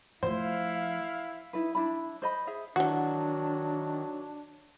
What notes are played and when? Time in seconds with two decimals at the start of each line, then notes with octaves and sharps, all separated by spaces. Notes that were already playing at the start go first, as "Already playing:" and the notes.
0.23 F3 A3 E4 C5 F5
1.53 D#4 E4 B4
1.75 D4 E4 B5
2.22 C5 D#5 B5
2.47 G#4 E5
2.76 D#3 E3 F#3 D4 F#4